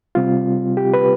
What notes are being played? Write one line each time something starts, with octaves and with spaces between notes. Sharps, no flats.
C3 G3 C4 F4
G4
B4